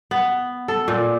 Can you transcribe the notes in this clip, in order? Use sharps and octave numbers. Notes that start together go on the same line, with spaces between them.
B3
A4
A#2